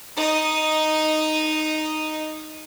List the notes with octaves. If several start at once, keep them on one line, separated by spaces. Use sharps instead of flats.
D#4 D#5